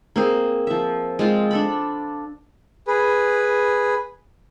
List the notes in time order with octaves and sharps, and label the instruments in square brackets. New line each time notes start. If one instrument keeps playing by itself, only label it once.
[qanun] A#3 C4 G#4
F3 E5
G#3 C4 F4
D4 A4 B5
[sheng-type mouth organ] G#4 B4